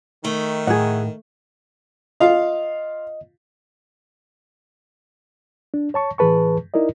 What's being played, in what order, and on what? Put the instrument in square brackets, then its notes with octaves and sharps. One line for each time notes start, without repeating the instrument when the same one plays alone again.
[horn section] D#3 [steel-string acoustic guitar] A3
[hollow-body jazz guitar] A2 [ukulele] G#4 F#5
[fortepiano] F4 F5 [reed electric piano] D#5
[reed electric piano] D4
C#5 A5 C#6
A2 E3 G#4 B4 A5 C#6
D#4 E4 A#4 D5 D#5